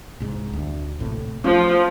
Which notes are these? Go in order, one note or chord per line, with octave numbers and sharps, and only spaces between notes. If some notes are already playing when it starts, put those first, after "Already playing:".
C2 G#2
D2
A#1 A2 C3
F3 A3 C#4